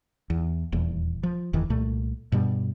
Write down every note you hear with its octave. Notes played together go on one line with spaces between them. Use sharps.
E2
D#1 E2
F3
F1 E2 D#3 E3
C2 A#2 A3
G2 B2 G3